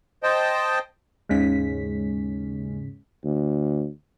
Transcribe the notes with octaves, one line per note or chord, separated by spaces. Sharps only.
C5 D#5 G5 A5
D#2 G#2 C#3 G#3 C#4 B6
D2